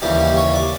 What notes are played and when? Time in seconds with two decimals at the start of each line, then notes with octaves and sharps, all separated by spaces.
0.02 D#2 C#3 E3 G3 G4
0.20 G4
0.37 C#5
0.54 D5